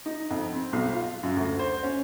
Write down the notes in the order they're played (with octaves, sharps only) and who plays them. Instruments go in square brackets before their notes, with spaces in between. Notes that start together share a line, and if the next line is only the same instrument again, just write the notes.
[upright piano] D#4
F2
C4
B1
F4
F#2
D2
C5
C#4